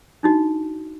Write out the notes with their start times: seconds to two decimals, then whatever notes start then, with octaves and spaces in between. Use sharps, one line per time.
0.23 D4 D#4 F#4